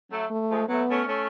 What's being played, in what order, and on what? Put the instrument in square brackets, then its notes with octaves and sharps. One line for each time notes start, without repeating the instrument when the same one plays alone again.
[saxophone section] F#3 A3
[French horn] A3
[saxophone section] F3 G#3
[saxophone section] F#3 A3 [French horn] B3
[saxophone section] A3 C#4
A3 C#4